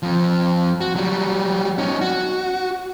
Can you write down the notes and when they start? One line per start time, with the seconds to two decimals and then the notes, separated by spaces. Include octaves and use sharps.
0.03 F2 F3
0.81 F#4
0.95 F#3 G3
1.78 C#4 D#4
2.01 F#4